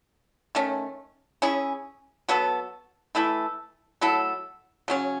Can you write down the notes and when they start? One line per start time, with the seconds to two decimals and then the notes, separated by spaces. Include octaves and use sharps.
0.55 D#3 A3 C#4
1.42 C#4 E4 G#4
2.28 F#3 B3 F#4 A4
3.15 E3 A3 E4 A4
4.01 F#3 A3 E4 A4
4.88 C#3 F#3 C#4